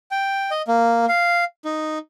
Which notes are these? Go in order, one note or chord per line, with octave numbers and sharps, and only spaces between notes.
G5
D#5
A#3
F5
D#4